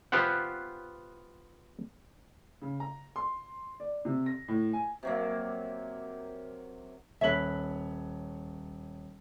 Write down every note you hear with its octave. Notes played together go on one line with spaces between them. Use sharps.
B3 F4 G4 C5 F#5
C#3
A#5
C6
D5
C3
A#6
A2
G#5
C3 F#3 A#3
D#1 B4 C#5 E5 F#7